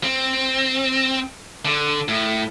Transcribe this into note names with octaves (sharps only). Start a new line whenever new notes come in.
C4
D3
A2